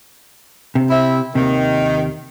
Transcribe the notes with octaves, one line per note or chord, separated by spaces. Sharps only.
C3
C4 E4 E5
D#2 C3 D#3